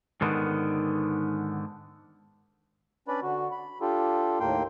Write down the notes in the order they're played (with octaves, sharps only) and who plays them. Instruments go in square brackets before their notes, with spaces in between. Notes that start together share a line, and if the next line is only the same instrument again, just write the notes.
[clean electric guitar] G#2 D3 D#3 B3
[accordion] C#4 D4 B4 D5 B5
D3 F#4
B5
D4 F4 G4 A4
D#2 A2 A#3 G5 C6